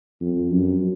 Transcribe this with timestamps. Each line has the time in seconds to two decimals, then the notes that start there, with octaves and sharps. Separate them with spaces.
0.21 F2
0.50 F#2